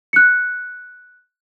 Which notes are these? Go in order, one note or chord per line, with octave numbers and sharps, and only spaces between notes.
F#6 C#7